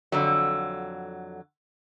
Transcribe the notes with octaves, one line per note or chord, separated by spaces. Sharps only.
F2 D3 F#3